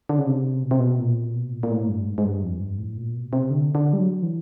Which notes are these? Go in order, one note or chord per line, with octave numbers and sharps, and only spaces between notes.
D3
C#3
C3
B2
C3
B2
A#2
B2
A#2
A#2
A2
G2
G#2
G#2
G2
F2
G2
A2
A#2
B2
C3
D3
D3
G3
F#3
E3